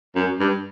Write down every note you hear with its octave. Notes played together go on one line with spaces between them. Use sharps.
F#2
G2